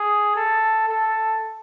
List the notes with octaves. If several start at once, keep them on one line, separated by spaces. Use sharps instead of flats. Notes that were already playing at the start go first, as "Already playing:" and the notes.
Already playing: G#4
A4
A4